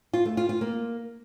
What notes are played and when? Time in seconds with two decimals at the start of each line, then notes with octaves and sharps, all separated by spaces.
0.13 F4
0.25 A3
0.37 F4
0.49 F4
0.61 A#3